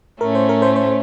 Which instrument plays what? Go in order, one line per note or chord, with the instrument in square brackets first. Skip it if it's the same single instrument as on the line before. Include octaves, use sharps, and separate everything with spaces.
[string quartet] A2 A3 C#4 [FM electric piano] A#4
[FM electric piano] C5
A#4
C5
C5